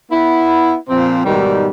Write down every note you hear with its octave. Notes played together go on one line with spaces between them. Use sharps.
B3 E4
A#2 F3 C4
G#2 B2 D#3 G3